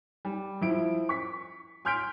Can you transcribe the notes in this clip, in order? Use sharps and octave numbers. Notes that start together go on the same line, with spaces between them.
G3
F3 E4 D7
C#6 B6
G#5 C6 F6 G6 B6 D7